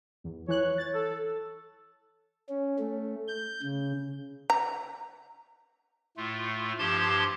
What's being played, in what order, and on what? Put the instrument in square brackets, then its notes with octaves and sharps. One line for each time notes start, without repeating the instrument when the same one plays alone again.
[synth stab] E2
[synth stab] E3 F#6 [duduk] C#5
[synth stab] A6
[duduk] A4
[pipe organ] C#4
A3
G6
C#3
[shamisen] A#5
[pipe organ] A2 A3 F4
G2 F3 G4 A5 C6 G#6